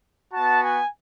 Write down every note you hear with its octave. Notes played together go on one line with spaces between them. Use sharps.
B3 F#4 A5
G#5